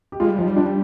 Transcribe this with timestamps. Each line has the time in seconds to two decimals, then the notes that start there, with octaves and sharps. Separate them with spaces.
0.12 G4
0.20 G#3 F4 G#4
0.29 G3
0.38 F3 D#4 G4
0.47 G3
0.56 D4 F4